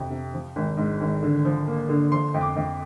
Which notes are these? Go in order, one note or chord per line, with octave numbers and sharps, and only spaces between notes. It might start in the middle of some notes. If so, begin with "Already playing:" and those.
Already playing: F2 C3
C3
F3
G#1
G#2
G#1
D3
F3
A#3
D3
F3 C6
F2
D6
F2